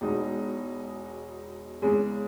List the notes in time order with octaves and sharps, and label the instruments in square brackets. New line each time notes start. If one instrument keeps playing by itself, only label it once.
[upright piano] E1 E2 B2 G#3 D#4
E2 C#3 G#3